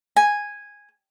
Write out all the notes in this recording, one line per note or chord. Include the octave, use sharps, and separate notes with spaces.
G#5